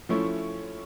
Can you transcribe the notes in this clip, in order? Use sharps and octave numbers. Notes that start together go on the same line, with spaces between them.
F3 A3 C#4 E4